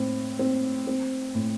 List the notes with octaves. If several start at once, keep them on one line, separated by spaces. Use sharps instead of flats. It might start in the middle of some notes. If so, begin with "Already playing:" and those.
Already playing: A2 C4
C4
C4
A2